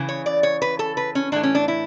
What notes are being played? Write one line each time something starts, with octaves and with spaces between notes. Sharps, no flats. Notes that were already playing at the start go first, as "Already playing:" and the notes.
Already playing: C#3 E3
C#5
D5
C#5
B4
A4
B4
C#4
A2 E3 A3 D4
C#4
D4
E4